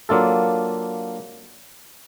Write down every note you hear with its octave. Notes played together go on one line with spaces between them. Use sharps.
F#3 A#3 D4 F4 A4